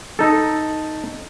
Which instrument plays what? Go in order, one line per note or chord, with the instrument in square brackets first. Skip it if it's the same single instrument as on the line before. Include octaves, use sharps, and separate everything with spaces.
[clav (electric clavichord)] D#4 A4